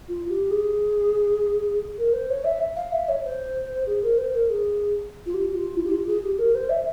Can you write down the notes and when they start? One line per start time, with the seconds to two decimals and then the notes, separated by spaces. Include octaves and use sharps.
0.08 F4
0.29 G4
0.51 G#4
1.98 A#4
2.13 C5
2.30 C#5
2.44 E5
2.76 F5
2.92 E5
3.09 C#5
3.24 C5
3.87 G#4
4.03 A#4
4.18 C5
4.34 A#4
4.50 G#4
5.26 F4
5.34 G4
5.54 F4
5.76 E4
5.85 G4
5.92 F4
6.07 G#4
6.23 G4
6.39 A#4
6.55 C5
6.70 E5